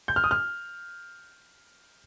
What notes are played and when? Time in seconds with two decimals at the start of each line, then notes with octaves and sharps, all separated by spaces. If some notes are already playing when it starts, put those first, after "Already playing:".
0.08 G6
0.16 F6
0.24 D#6
0.31 F6